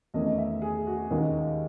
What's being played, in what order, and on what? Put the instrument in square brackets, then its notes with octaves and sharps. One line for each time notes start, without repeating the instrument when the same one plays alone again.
[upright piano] E2 D#3 A3 C#4 D#5
E5
G#4
F#4
D#2 D#3 G#3 C#4